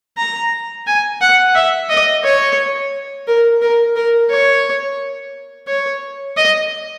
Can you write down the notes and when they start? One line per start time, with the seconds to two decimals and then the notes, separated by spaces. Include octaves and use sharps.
0.17 A#5
0.87 G#5
1.21 F#5
1.55 E5
1.89 D#5
2.24 C#5
3.27 A#4
3.62 A#4
3.96 A#4
4.30 C#5
5.68 C#5
6.37 D#5